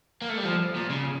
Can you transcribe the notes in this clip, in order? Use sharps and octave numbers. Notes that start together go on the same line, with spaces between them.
A#3
A3
G3
F3
A#2
C#3